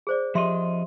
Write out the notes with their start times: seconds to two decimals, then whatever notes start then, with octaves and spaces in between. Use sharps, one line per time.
0.07 G#4 C5 D5
0.35 F3 G4 D#5 E5 C6